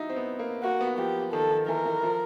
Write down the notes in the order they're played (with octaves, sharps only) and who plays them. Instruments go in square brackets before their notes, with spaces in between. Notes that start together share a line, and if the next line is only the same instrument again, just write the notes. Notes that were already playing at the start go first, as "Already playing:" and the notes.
Already playing: [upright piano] D#4 E4 F#4
C4
B3
A#3
[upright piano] A#3 [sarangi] F#4
[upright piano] B3
[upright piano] F3 [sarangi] G4
[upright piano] D#3 [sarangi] A4
[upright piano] D#3
[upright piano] E3 [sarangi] A#4
[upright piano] E3
F3